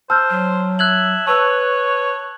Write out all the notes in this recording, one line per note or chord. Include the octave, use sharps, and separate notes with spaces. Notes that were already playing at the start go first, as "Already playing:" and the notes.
C5 A5 E6 F6 G6
F#3
E5 F#6 G#6 F#7
B4 C#5 A5 E6